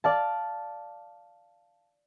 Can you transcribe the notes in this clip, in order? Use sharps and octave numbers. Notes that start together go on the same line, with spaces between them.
D5 F5 A5